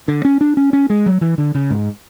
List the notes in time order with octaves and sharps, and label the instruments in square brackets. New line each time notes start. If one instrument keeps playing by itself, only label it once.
[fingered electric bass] D3
C#4
D4
C#4
C#4
G#3
F#3
E3
D3
C#3
G#2